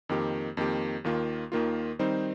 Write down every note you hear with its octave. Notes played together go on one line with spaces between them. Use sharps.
F2 D#3 A#3 G4
F2 D#3 A#3 G4
D#2 D#3 A#3 F4
D#2 D#3 A#3 F4
D#3 G3 C4 D#4 C5